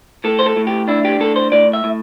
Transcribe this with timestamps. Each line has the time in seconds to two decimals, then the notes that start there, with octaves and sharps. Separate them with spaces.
0.24 A2 A4
0.39 C5
0.46 A4
0.56 A2
0.67 G4
0.88 D4 E4
1.05 G4
1.20 A2 A4
1.36 C5
1.52 A2 D5
1.73 E5
1.84 A2